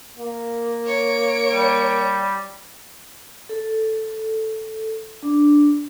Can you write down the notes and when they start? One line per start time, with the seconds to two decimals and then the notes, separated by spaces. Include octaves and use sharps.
0.18 A#3
0.86 C#5 D7
1.52 G3
3.49 A4
5.23 D4